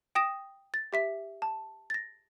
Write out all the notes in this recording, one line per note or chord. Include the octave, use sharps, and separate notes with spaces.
G5 D#6 A#6 E7
A6
G4 E5 B6
A5
A6 A#6